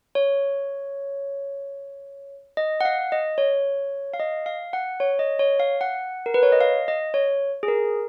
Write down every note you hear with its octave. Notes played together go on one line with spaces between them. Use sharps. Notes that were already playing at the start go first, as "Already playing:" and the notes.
C#5
D#5
F#5
F5
D#5
C#5
F5
D#5
F5
F#5
C#5
D#5
C#5
F5
F#5
A#4
B4
C#5
D#5
F5
D#5
C#5
G#4
A#4